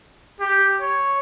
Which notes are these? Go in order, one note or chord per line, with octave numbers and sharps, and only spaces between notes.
G4
C#5